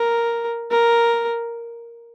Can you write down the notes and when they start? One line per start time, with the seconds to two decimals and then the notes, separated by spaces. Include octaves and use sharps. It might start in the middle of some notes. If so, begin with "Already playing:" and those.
Already playing: A#4
0.71 A#4